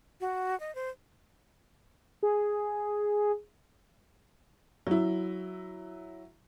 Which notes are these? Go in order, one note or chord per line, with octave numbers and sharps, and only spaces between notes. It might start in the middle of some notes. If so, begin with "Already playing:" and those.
F#4
D#5
C5
G#4
F#3 E4